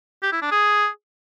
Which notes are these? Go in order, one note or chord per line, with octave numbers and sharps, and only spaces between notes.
G4
E4
D4
G#4